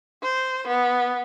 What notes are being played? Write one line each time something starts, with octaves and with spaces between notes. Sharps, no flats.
C5
B3